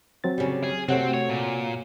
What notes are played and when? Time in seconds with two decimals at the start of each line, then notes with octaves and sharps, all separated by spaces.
0.24 F#3 C4 A6
0.38 C#3 G3
0.63 G#4
0.89 C3 F#3 A3 C4 F#5
1.14 C#5
1.29 A#2